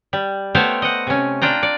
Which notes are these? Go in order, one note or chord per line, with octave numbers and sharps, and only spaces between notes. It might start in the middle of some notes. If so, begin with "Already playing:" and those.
G3
A3 B3 G4 C5 C#5 F5
D#5 F#5
C3 C#4
D4 F4 G5 A#5
D5